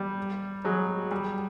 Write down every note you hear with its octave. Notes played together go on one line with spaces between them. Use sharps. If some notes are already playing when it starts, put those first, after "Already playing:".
Already playing: G3
F#3 G#3
G3